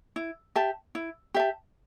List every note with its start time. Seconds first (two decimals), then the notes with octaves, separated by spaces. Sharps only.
0.16 E4
0.56 G4 E5 A5
0.95 E4
1.34 G4 E5 A5